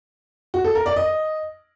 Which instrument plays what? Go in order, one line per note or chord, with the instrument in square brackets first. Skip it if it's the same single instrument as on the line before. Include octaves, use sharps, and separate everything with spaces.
[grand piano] F#4
A4
A#4
D5
D#5